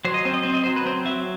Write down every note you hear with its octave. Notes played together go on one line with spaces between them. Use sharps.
F#3 C5
D#5
C4 C5
D#5
C4 C5
D#5
C5
F#3
B4
C4 C5
F#3 E5